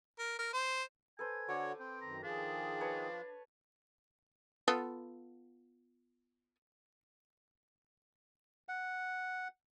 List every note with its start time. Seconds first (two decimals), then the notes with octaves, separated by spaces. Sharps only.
0.19 A#4
0.39 A#4
0.53 C5
1.19 A4 B4 C5 G#5
1.49 D3 F#4 C#5 D6
1.79 C4 G5
2.01 F#2 D#3 A#5
2.23 D#3 F3 D4 G#4
2.81 B4 C#5 A5
4.68 B3 F4 A4
8.69 F#5